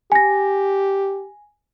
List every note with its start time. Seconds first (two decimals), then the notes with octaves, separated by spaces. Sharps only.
0.12 G4 G#5 A#6